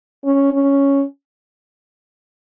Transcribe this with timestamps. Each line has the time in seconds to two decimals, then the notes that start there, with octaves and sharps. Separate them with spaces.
0.25 C#4
0.52 C#4